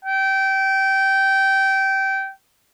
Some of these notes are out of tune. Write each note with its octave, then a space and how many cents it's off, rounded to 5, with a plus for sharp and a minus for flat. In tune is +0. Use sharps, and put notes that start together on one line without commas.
G5 -20